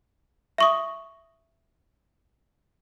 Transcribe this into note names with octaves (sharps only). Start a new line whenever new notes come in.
E5 C#6 D#6